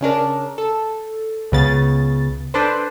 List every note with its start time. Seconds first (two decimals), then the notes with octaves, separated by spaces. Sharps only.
0.01 C#3 C#4 D4 A#4
0.58 A4
1.52 C#2 C#3 B3 A6
2.54 D4 A4 B4 C5